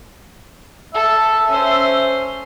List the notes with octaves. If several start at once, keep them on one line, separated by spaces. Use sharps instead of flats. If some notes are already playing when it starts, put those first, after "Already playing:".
A4 E5
C#4 C5